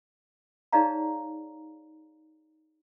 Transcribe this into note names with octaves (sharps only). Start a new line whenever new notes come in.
D#4 G#4 C#5 D5 F5 A#5